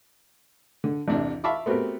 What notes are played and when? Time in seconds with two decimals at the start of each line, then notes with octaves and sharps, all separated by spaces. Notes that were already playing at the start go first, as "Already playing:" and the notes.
0.84 D3
1.08 A1 E2 C3 D4
1.44 E5 F5 A5 B5 C#6 D6
1.66 A3 B3 C4 F#4 G4 A#4